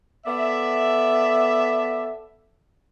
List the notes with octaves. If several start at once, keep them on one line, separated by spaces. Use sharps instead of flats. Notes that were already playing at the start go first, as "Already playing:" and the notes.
B3 A4 D5 E5